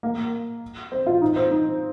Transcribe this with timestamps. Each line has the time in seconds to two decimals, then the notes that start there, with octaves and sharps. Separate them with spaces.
0.03 A#3
0.92 C4
1.07 F4
1.21 D#4
1.36 C4
1.51 D#4